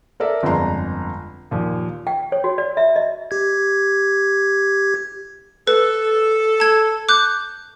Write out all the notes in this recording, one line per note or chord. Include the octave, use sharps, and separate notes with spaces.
A4 A#4 D5 E5
G1 F2 G#3 D4 A#5 C6
D#2 A#2 F3
G5
C#5
F#4
D5
E5
D#5
G4 G#6
A4 B4
A5 G#6
D6 F#6 G6